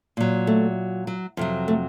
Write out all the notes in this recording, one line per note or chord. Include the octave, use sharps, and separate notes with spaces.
A#2 F#3
A3
F#3
F2 C3 F#3
A3